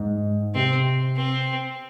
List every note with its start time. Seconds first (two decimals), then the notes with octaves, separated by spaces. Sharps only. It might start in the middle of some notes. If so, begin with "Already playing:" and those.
Already playing: G#2
0.55 C3 C4
1.17 C4